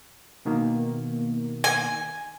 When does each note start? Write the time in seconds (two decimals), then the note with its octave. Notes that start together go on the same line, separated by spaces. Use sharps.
0.45 B2 D#3 A#3
1.64 G#5